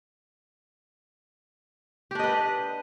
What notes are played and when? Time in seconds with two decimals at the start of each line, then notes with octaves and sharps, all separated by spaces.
2.11 G4
2.15 D4
2.19 D#5
2.24 B4